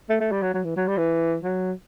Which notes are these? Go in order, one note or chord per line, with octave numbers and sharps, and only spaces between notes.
A3
A3
G3
F#3
F#3
E3
F#3
G3
E3
F#3